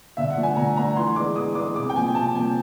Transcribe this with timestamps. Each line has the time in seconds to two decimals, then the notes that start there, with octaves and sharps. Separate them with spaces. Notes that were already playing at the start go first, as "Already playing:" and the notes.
0.17 D3 E5
0.30 F#5
0.37 F3 A3 D4
0.43 G#5
0.56 D3 A#5
0.77 F3 A3 D4 A#5
0.96 E3 C6
1.16 G#3 B3 D4 D6
1.36 E3 D#6
1.55 G#3 B3 D4 D6
1.75 C3 D6
1.90 G5
1.95 F3 A#3 G#5
2.15 C3 A5
2.35 F3 A#3 G#5